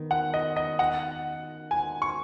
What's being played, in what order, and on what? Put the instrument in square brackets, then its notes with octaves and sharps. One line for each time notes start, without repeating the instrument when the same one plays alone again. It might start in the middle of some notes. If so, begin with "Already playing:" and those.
Already playing: [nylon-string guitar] D#3 B3
[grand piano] F#5
D#5
D#5
F#5
G#5
C#6